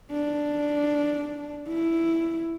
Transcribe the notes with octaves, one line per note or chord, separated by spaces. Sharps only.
D4
E4